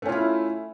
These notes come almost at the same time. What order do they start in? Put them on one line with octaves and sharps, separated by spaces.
A3 C#4 F4 E4